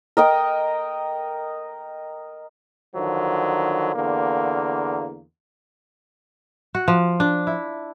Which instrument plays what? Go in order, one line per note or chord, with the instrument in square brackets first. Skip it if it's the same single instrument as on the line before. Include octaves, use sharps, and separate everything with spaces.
[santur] A#4 D#5 G5
[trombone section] D3 D#3 F3 F#3
E2 D3 A#3
[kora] F#4
F3
D4
E4